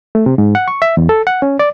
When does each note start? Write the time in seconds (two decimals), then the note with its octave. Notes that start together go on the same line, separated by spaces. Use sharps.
0.15 A3
0.26 C3
0.38 G#2
0.55 F#5
0.68 C#6
0.82 E5
0.97 E2
1.09 A4
1.27 F#5
1.42 C#4
1.59 D5